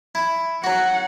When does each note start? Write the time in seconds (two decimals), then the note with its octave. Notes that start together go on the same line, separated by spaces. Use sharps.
0.15 E4
0.64 F#3 F#4 F#5